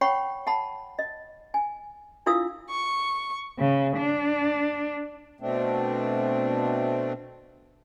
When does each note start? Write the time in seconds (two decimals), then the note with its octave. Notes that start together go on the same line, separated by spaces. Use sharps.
0.01 C#5 F#5 G5 B5 C#6
0.47 F#5 A5 B5
0.99 D#5
1.54 G#5
2.26 D4 E4 F4 F5 D#6 E6
2.71 C#6
3.59 C#3
3.97 D4
5.40 B2 A3 C4 D4